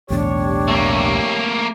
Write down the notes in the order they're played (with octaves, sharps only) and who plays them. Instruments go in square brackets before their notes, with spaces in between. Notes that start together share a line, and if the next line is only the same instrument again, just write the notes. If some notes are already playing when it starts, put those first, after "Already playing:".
[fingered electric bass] B1 E2 A2 [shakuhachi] D4 [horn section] G4 C#5
[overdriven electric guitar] A3 A#3